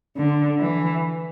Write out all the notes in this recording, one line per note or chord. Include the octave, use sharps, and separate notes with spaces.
D3
E3